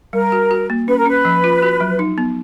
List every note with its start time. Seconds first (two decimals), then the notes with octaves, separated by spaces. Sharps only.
0.13 G3 A#4
0.32 F#4
0.51 F#4
0.70 A#3
0.88 C#4 B4
0.98 A#4
1.06 C#4 B4
1.25 F3
1.44 F4
1.62 F#4
1.81 F#3
1.99 D#4
2.18 B3